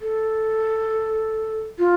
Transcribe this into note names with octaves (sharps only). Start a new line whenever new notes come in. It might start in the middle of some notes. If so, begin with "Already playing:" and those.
A4
F4